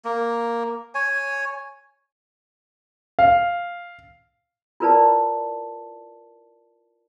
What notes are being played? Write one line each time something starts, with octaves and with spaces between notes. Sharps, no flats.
A#3
C#5 G#5
F5
E4 F4 A#4 B4 D5 A5